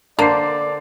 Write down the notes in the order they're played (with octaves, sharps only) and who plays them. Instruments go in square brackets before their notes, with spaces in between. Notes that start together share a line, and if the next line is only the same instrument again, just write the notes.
[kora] D3 C5 [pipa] A#3 [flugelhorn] D5 [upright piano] A5 C7